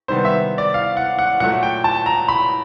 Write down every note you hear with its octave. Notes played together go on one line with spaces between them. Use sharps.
C3 D#3 G3 B3 C5
E5
D5
F5
F#5
F#5
A#2 F#3 A3 F#5
G5
A5
A#5
B5